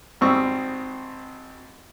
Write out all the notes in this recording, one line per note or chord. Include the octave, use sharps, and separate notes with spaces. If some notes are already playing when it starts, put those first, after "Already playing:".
G#1 G3 C4 C#6 D#6 E6